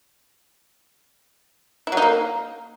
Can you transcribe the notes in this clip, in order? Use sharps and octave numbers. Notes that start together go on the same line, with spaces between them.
E4
F#3
D#4
A#3